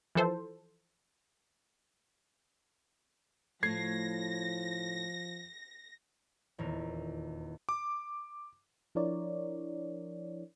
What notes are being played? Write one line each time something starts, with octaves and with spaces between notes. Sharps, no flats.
E3 F3 A4 C5
A2 F3 A3 G#6 A#6 C7
D#1 E2 A#4
D6
F3 D4 E4 A#4 C#5 D5